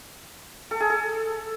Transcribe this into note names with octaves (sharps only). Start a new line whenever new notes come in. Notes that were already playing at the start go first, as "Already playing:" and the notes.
A4
G#4
A4